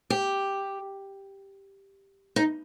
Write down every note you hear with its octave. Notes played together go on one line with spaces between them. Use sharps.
G4
D#4